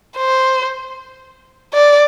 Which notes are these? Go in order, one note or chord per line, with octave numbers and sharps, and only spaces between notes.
C5
D5